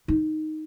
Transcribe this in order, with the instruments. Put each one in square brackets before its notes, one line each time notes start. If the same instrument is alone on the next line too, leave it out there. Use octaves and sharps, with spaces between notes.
[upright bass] D#4